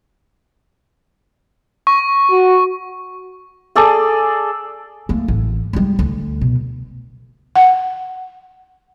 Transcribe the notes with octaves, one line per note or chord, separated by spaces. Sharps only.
C#6
F#4
G#4 A4 D5
A3 A#3
A1
G3 G#3
D2
B2
F#5